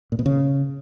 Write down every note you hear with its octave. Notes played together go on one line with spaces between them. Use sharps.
A#2
B2
C#3